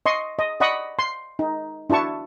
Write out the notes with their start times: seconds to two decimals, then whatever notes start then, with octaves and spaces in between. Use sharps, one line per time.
0.06 D#5 C6 C#6
0.39 D#5
0.60 D5 D#5 F#5 B5 C#6 D#6
0.99 C6
1.39 D#4
1.90 D4 E4 F#4 A5 C#6